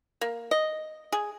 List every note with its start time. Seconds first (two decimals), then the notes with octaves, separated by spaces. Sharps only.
0.21 A#3
0.51 D#5
1.12 G#4